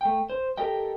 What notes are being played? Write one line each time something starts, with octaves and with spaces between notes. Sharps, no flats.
A3 G5
C5
G4 A4 A#4 D#5 G5